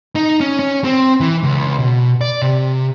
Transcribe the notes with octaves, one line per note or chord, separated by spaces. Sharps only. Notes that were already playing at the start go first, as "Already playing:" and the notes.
D#4
C#4
C#4
C4
E3
C#2
B2
D5
C3